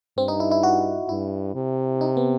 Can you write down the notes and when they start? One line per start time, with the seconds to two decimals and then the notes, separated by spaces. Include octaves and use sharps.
0.17 G2 C4
0.28 D#4
0.40 E4
0.51 E4
0.63 F#4
1.09 G2 E4
1.55 C3
2.01 D#4
2.17 B3